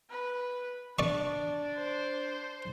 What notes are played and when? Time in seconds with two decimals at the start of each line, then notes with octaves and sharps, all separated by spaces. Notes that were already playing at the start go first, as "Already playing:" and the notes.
0.10 B4
0.99 D4 D5 C#6
1.77 C5